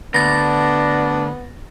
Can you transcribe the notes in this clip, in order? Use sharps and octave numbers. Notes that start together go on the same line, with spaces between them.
D2 B3 D4 A6 A#6